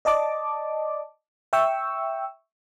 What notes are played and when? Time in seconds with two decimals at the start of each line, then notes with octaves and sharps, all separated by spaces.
0.05 D5 D#5 A5 D6
1.53 E5 G5 C#6 E6